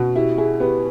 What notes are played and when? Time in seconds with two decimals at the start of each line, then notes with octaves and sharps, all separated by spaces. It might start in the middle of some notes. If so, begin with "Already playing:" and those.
Already playing: B2 C#4 F#4
0.16 E4 G4
0.38 E4 G#4
0.60 B3 G4